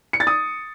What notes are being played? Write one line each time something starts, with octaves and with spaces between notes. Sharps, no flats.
C#7
A6
D#6